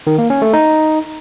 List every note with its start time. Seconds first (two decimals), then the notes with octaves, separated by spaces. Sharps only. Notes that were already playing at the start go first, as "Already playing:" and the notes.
0.07 D#3
0.18 A#3
0.30 C#4
0.42 A3
0.53 D#4